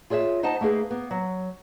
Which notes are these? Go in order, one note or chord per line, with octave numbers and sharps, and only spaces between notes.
F4 G#4 C#5 D#5 E5
D#4 C5 D#5 F#5 A5
A3 A#3 D#4 G#4 B4
A#3 B3
F#3